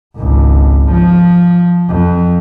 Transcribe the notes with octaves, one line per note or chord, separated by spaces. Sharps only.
G#1 C#2
F3
F2